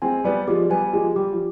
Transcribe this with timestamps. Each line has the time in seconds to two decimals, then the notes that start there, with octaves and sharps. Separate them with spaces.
0.02 G#3 C4 G#5
0.24 G3 B3 D5
0.47 F3 G#3 G4
0.70 G3 B3 G#5
0.93 F3 G#3 G4
1.16 G3 G4
1.33 F3